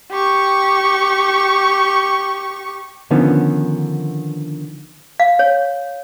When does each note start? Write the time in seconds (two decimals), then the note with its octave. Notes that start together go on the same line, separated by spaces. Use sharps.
0.11 G4 C#6
3.11 D3 D#3 F3 B3 C#4
5.20 F5
5.39 C#5